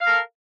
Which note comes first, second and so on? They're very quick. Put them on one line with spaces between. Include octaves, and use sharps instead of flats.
F5 A#4 A4